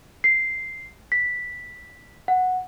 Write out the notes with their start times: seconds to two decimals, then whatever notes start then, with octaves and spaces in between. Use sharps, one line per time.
0.24 C7
1.12 B6
2.28 F#5